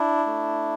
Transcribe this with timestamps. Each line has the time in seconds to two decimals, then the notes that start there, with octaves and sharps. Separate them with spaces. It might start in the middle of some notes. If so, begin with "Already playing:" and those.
Already playing: D4 E4
0.26 A3